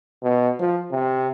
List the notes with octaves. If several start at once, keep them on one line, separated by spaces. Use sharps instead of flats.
B2
F3
C3